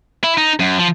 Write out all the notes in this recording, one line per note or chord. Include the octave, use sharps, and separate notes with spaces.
E4
D#4
F#2
F3